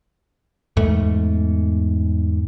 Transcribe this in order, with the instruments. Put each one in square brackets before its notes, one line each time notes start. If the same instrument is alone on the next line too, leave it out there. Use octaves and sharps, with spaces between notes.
[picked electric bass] E2 G#2 A3